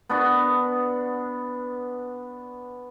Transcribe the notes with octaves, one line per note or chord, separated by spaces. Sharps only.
B3 D4 F#4